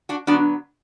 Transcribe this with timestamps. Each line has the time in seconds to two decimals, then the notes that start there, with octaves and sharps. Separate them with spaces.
0.09 D4 F#4
0.27 D3 F#3 B3 D4 F#4